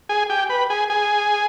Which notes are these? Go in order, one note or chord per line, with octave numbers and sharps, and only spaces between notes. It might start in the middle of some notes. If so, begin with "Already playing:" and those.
G#4 G#5
G4 G5
B4 B5
G#4 G#5
G#4 G#5